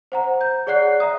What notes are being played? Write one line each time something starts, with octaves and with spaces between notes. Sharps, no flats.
C5 F#5 A#5
G6
G#4 C#5 D5 F#5 F#6 C7
E5 A#5 D#6